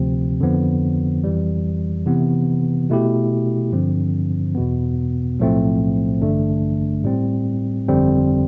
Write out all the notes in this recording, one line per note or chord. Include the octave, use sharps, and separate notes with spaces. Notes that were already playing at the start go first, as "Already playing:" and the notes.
Already playing: D2 C3 F3 C4
F2 D3 F3 B3
F2 E3 G3
C3 E3 B3
B2 A3 E4 G4
G2 D3 F3 C4
E2 B2 B3
B1 A2 F3 A3 C4
A1 G2 D3 A3 D4
A2 G3 C4
G1 F2 D3 G3 C4